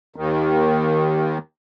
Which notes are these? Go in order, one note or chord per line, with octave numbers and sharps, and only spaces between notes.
D#2 D#3